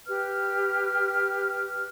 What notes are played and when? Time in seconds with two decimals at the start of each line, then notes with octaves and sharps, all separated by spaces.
0.07 G4 B4 F6